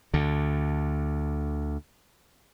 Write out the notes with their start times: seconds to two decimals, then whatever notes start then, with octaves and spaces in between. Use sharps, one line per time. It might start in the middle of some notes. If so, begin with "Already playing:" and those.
0.14 D2 D3